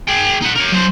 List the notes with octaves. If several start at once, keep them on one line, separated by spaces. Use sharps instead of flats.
G#4 G5
D#4 F#5
A#4 C#5
F#3 C5